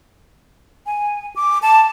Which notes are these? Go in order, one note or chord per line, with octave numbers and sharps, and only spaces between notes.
G#5
D6
A5